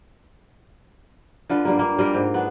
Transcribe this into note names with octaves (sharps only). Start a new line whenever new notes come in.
D3 F4 B4
G2 G3 A#3
A#3
G3 F4 A#4
G#2
B3 D4